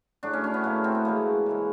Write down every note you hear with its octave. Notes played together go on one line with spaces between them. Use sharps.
A2 F#3 A3 D4
C#4
C#4
B3
A2 F#3 A3 A#3
C4
B3
C#3 E3 G#3 A#3
C#3 E3 G#3